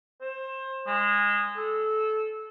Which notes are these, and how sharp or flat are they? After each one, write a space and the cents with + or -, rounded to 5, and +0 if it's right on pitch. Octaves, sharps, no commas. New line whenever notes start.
C5 +25
G#3 -20
A4 -20